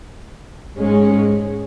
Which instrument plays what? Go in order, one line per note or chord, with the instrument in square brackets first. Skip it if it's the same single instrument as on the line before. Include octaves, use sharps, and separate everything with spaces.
[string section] G#2 G#3 C#4